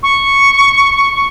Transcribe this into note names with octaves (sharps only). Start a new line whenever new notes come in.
C#6